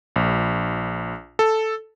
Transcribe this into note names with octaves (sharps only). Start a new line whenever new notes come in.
A#1
A4